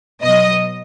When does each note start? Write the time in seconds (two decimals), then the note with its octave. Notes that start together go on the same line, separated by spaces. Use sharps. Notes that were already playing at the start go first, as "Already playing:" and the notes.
0.23 B2 F#3 D#5